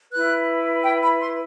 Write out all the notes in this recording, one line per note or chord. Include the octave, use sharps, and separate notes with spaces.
E4 B4 F#6
G5
B5
C6